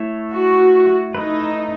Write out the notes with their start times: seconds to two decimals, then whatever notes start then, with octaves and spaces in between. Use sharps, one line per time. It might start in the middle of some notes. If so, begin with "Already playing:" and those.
Already playing: A3 E4 A4 C#5
0.32 F#4
1.14 A3 D#4 E4 B4